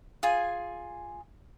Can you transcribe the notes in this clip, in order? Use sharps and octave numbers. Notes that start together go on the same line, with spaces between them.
F4 G#4 G#5